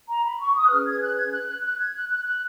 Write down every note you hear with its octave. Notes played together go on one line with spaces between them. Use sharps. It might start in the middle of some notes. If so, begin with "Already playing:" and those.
A#5
B5
C#6
D#6
F#6
C#4 G#4 B4 F6
G#6
F#6
G#6
F#6
F#6
F#6
G#6
F#6
F#6
F#6